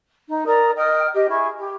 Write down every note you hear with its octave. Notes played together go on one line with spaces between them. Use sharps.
D#4
A#4 D5 A#5 D#6
D#5 G5 D#6 F6
G4 D#5
E4 G#4 C#6
G4